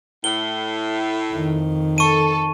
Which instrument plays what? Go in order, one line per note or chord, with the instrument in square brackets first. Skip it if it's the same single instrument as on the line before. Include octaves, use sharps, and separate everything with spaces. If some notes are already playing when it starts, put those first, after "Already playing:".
[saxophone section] A2 [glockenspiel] G7
[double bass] F2 D#3
[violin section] A4 [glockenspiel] C#6 D#7